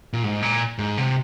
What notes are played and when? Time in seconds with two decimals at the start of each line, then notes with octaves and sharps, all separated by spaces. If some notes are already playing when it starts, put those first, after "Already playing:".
0.13 A#2
0.23 G#2
0.42 A#2
0.79 G#2
0.98 C3